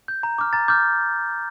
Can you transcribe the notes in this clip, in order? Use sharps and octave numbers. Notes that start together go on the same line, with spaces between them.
G6
A#5
D6 F6
A#5 A6
D6 F6 G6